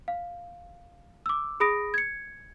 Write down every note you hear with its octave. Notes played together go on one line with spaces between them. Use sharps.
F5
D6 E6
G#4 B5 D#6 A#6 D7
G#6 C#7